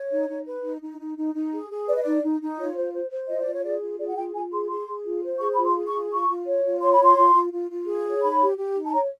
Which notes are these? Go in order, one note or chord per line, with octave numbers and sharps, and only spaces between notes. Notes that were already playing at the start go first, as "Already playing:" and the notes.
Already playing: C#5
D#4
D#4
B4
D#4
D#4
D#4
D#4
D#4
G#4
G#4
B4 D5
D#5
D#4 D5
D#4
D#4
F4 C#5
C5
C5
C5
F4 D#5
D5
F4
C#5
G#4 D5
F4
G#4 D5
F#5
F4 G5
F4 G#5
G#4 C6
G#4 C6
G#4
F4
C5
G#4 C#6
F4 B5
C6
G#4
C#6
F4
F4 C#6
F4
C#5
F4
C#5 C6
B5
F4 C6
F4
F4
F4
F4
G#4
C#5
D#4 B5
G4
G4
D#4
A5
C#5 A#5